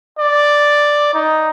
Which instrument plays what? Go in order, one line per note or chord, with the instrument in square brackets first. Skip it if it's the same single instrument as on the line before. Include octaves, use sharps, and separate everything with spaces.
[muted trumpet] D5
D#4